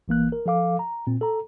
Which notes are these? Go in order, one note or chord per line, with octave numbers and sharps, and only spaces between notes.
A1 E3 A#3 F#6
A#4
F3 A4 F5 D6
A#5
A#2 C4
A4 A#5